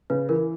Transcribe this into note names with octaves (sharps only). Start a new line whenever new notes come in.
C#3 B4
E3 A#4